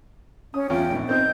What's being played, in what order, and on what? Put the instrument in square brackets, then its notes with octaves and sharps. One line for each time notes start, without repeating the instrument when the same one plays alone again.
[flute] C#4 [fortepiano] D#6
[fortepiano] E2 C#4 F4 [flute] G5
[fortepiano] A#1 G#2 B3
[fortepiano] C4 D#4 C5 [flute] G6